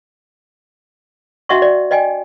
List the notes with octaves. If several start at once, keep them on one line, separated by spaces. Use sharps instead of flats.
D4 F#4 D#5 E5 F#5 C#6
D5
D5 D#5 G5 G#5